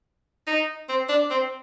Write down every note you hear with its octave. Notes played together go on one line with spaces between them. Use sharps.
D#4
C4
D4
C4